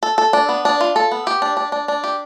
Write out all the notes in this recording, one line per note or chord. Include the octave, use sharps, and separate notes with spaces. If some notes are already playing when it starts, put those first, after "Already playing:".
A4
A4
D4
B3
D4
F4
A4
B3
G4
D4
D4
D4
D4
G4